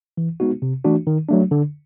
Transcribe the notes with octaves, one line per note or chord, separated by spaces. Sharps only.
E3
G#3 B3 D#4 F#4
C3
E3 A3 D4 F#4
D#3
F#3 A3 D4
D3